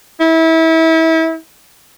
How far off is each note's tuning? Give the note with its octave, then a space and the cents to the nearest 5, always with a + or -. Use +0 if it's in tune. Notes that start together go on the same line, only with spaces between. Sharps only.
E4 -30